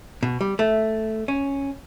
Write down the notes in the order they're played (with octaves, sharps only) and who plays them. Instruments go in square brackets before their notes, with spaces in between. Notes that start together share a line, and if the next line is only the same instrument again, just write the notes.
[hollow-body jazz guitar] B2
G3
A3
C#4